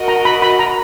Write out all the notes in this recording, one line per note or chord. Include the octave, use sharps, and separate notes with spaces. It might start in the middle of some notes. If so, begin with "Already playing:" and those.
Already playing: F#4 A#4 D#5
A#5
B5
B5
A#5